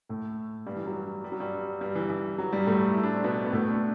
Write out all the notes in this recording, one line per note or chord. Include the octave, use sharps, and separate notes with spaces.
A2 A3
G2 G3
E3
F#3
G3
F#3
G2 G3
G2 G3
E3
E3
F#3
G2 G3
A2 A3
E4
D4
C4
B2 B3
B3
A2 A3
D4